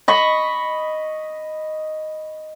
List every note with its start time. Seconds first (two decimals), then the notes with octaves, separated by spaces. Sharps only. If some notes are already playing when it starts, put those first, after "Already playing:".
0.08 D#5 B5 C#6